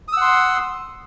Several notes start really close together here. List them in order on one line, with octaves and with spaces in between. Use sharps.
D#6 E6 F#5 C6